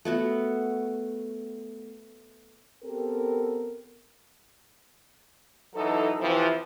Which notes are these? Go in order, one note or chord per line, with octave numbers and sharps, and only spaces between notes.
A3 B3 F#4
B3 C4 G4 A4 A#4
E3 F#3 D#4 A4
C3 E3 F3